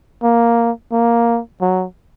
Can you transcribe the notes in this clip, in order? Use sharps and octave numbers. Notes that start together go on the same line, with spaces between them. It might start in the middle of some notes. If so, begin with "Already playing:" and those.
A#3
A#3
F#3